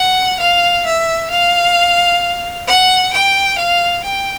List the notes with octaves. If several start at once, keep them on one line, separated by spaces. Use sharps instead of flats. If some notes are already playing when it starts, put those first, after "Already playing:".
Already playing: F#5
F5
E5
F5
F#5
G5
F5
G5